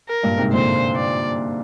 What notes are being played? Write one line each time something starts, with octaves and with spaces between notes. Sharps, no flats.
A#4
G2 A#2
G#2 C3
A#2 D3 C5
D5